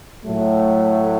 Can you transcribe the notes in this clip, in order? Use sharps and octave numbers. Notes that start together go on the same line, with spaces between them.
A2 F#3 A3